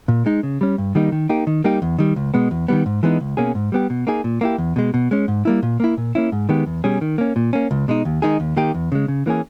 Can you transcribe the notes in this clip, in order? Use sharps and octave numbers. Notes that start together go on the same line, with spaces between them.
A#2
G#3 D#4
C#3
G3 C#4
G2
D#3 G3 A#3 D#4
D#3
A#3 D#4 G4
D#3
G3 A#3 D#4 G4
E2
D#3 G3
C#2
B2 G#3 B3
E2
D#3 G3 B3
G#2
E3 G#3 B3 D#4
C#2
B2 A#3 C#4 G#4
G#2
G3 B3 G4
B2
A#3 D#4 G#4
A#2
A#3 E4 G4
E2
B2 G#3
B2
G#3 C#4
G#2
G3 A#3 E4
A#2
A#3 E4
A#2
A#3 C#4 E4
G#2
D#3 G#3 B3 G4
E2
B2 G3 C#4 G#4
D#3
A#3 C#4
A#2
A#3 C#4
C#2
B2 G#3 D#4
D#2
D#3 G#3 D#4 G#4
D#2
D#3 A#3 D#4 G4
E2
C#3 G#3
C#3
E3 A#3 C#4 G#4